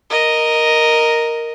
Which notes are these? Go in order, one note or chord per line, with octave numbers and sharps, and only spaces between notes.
A#4 D#5